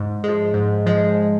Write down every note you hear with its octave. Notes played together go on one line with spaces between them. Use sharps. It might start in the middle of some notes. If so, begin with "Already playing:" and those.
Already playing: G#2
F3 G#3
G#2
F3 G#3